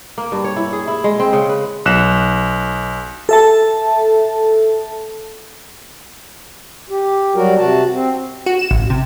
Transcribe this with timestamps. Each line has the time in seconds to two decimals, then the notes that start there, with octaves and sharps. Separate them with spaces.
0.18 A#3
0.32 G2
0.44 C#5
0.56 E4
0.73 G#4
0.88 E4
1.04 G#3
1.20 C4
1.33 C#3
1.49 B4
1.86 B1 F#6 E7
3.29 A4 E5 A5
6.90 G4
7.35 F#3 G3 F#4 A#4
7.58 C3 F#4 A5
7.94 C4
8.46 F#4
8.59 E7
8.71 A1
8.90 C3